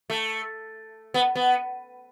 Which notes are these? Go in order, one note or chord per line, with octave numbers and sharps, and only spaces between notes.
A3
B3
B3